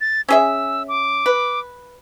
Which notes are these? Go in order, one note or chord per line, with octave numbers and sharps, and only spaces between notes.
A6
C#4 G#4 E5 E6
D6
B4